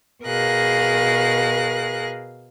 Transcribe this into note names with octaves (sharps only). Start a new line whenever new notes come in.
B2 G#4 A#4 F5 F#6 A#6